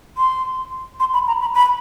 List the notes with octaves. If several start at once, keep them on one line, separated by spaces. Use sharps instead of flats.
C6
C6
B5
A#5
B5
B5